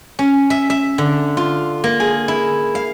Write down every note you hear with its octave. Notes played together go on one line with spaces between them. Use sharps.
C#4
E5
E5
D3
F4
A#3
G#4
E4
F5